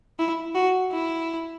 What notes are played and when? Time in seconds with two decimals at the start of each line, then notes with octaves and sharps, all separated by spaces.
0.19 E4
0.55 F#4
0.92 E4